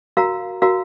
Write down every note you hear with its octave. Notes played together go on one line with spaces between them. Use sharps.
F#4 A#4 F5 A#5
F#4 A#4 F5 A#5